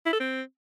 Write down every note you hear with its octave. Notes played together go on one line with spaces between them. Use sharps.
E4
A4
C4